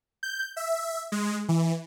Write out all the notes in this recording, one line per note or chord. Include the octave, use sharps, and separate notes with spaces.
G6
E5
G#3
E3